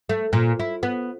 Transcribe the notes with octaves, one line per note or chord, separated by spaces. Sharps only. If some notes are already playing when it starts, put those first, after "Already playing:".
A3
A#2
E4
B3